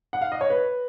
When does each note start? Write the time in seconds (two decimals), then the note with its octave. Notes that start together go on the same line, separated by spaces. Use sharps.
0.13 F#5
0.21 F5
0.32 D#5
0.41 C#5
0.50 B4